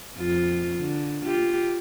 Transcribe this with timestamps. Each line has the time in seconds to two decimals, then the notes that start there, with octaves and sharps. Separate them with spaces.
0.17 F2 F4
0.78 D3
1.25 F4 G4